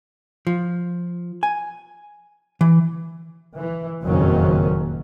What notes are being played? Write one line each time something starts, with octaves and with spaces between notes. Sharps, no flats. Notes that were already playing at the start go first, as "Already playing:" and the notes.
F3
G#5
E3
E3
F#1 F2 A#2 D#3 F#3 C#4